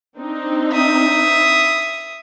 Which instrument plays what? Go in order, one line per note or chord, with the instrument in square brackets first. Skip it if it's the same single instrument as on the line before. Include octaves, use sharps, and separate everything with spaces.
[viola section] C4 D4 D#4
[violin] E5 D#6